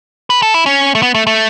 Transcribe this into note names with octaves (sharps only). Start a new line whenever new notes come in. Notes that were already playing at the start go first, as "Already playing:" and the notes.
B4
A4
E4
C#4
A3
B3
A3
A3